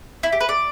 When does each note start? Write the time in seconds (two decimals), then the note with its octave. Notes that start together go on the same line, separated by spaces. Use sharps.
0.23 E4
0.32 G4
0.41 B4
0.49 D5